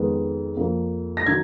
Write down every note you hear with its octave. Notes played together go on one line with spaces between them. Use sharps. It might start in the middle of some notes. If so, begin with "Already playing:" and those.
Already playing: F2 D#3 G#3 B3
F2 F3 A#3
A#6
D#3 F#3 G#6